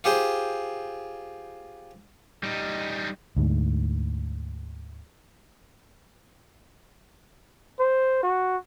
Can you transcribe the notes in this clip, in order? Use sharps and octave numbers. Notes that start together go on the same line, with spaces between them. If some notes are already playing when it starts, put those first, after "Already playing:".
F4 G4 G#4 C5
G3 D#4
D2 G#2
C5
F#4